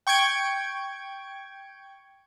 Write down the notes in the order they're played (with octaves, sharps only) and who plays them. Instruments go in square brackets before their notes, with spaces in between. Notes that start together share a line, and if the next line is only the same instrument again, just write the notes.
[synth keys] G5 C#6 G6 G#6 D7